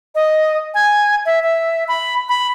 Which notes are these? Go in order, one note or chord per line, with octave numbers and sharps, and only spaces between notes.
D#5
G#5
E5
E5
B5
B5